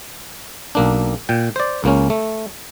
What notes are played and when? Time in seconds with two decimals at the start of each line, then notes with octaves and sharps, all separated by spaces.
0.75 B1 A#3 D4
1.29 A#2 G5
1.56 C5 D5
1.84 C#2 A#3 C#4
2.10 A3